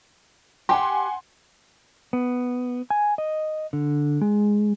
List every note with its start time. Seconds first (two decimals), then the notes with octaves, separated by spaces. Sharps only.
0.69 G4 F#5 G#5 C6
2.13 B3
2.90 G#5
3.18 D#5
3.73 D3
4.21 G#3